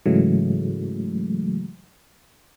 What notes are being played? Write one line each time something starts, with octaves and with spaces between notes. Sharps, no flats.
G#2 C#3 E3 F#3 G#3 A3